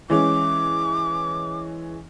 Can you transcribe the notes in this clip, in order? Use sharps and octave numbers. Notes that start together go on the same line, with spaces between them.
E3 G#3 C#4 D6